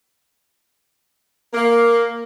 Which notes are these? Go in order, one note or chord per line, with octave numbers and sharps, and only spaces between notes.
A#3